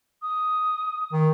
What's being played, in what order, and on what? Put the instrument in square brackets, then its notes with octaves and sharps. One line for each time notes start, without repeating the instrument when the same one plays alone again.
[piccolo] D#6
[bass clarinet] D#3